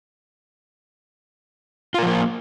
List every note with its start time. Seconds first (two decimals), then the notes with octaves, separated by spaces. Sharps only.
1.94 F4
1.99 A#4
2.03 F3
2.07 A#3